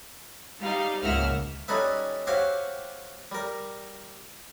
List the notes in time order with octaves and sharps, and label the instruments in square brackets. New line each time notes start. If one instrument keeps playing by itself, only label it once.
[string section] G3 D#4 F5
C#2 G#2 A#3 E5 F#5 F6
[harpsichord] G3 C#4 D#4 A4 B4 E5
F#4 G4 C5 C#5 E5 F5
G3 A#4